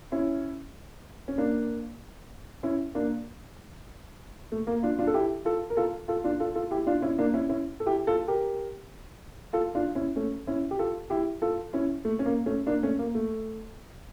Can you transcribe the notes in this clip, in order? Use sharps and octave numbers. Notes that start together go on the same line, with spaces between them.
C#4 E4
C#4
A#3 D4
C#4 E4
A#3 D4
A3
A#3
D4 F4
D4 F4
A4
E4 G4
F4 A4
A#4
F4 A4
F4 A4
D4 F4
F4 A4
F4 A4
E4 G4
D4 F4
C#4 E4
A#3 D4
C#4 E4
C#4 E4
A4
E4 G4
F4 A4
G4 A#4
F4 A4
D4 F4
C#4 E4
A3 C#4
C#4 E4
G4
F4 A4
E4 G4
F4 A4
C#4 E4
A3
C#4
A#3
A3 C#4
A#3 D4
A3 C#4
A#3
A3